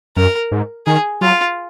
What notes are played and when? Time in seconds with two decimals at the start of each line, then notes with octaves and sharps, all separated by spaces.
0.16 F#2 A#4
0.51 G#2
0.86 D#3 G#4
1.21 F#3 F4